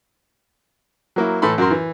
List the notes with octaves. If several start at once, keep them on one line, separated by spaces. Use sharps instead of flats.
F#3 A#3 E4
A2 E3 A4 B5 C6
F#2 F#4 A#4 C6
E3